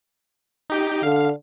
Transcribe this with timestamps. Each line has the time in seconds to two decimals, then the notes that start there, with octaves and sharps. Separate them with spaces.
0.70 D#4 G4 G5
1.03 D3 F5